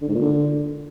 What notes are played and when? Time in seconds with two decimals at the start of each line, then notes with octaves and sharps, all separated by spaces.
0.02 D3
0.08 G#2
0.15 A#2
0.21 D3